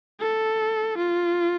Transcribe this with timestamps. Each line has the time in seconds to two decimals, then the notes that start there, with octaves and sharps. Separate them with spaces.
0.20 A4
0.98 F4